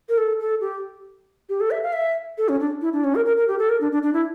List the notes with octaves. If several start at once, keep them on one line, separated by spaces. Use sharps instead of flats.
A#4
A4
A4
G4
G4
A4
E5
F5
E5
A4
C#4
D4
E4
D4
C#4
A#4
A#4
A#4
G4
A4
A#4
D4
D4
D4
E4